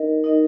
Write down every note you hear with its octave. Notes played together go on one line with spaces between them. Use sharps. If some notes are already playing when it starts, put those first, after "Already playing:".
Already playing: D#4 A#4 D#5
D#4 A#4 D#5